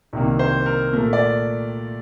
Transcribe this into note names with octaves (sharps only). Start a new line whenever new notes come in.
C2 C3 D#3 A#3
C5
A#4
A#2 A3 A#4
D5